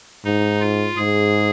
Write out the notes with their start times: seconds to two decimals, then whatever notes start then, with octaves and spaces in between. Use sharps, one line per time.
0.25 G#2 D#4
0.60 F4
0.97 G#2 G#4